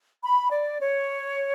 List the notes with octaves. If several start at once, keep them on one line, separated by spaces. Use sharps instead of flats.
B5
D5
C#5